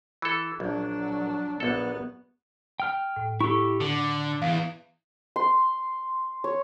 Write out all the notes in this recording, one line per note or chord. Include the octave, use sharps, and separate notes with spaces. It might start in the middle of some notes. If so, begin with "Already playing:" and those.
E3 A4
A#1 F#3 D4
A#1 F#3 B3 A4
G5 F6
A2
E4 G4 A4 C#6
D3 D6
E2 E3 F5
C6
C#5